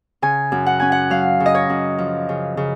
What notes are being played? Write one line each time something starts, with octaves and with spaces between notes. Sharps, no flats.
C#3 G#5
F#2
F#5
C#4 G#5
F#5
F#3 F5
C#3
D#5
C#5
F#2
F3
C#3
C#3